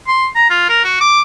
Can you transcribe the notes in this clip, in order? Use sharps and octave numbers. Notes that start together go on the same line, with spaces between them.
C6
A#5
F4
A#4
F#4
D6